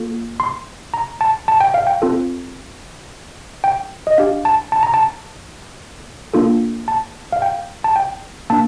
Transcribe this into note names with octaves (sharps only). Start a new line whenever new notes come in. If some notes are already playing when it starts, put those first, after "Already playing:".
Already playing: A#3 F4 A4
C6
A#5
A5
A5
G5
F5
G5
C4 F4 A4
G5
D#5
D4 G4 F5
A5
A5
A#5
A5
A#3 D4 F4 A4
A5
F5
G5
A5
G5
A#3 D4 A5